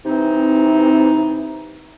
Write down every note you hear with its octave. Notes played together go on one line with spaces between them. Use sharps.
C3 E3 C4 D#4